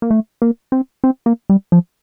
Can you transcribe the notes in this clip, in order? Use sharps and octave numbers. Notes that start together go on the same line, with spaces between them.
A#3
A3
A#3
C4
C4
A#3
G3
F3